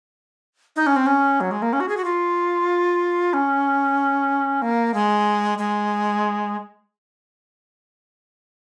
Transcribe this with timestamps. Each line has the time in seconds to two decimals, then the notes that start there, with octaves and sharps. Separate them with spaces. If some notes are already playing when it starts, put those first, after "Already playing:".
0.76 D#4
0.86 C#4
0.96 C4
1.06 C#4
1.40 F#3
1.51 G#3
1.62 A#3
1.73 C#4
1.80 F#4
1.88 G#4
1.97 F#4
2.04 F4
3.33 C#4
4.62 A#3
4.94 G#3
5.58 G#3